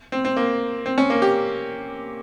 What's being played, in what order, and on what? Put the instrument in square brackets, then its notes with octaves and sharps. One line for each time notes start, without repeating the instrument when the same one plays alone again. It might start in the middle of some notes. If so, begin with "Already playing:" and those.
[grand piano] C4
C4
A#3
C4
C#4
A#3
G4